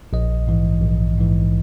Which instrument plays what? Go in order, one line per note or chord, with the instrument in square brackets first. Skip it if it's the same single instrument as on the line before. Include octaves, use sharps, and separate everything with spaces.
[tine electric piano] A#1 D#5
G#2 E3
A#1
G#2 E3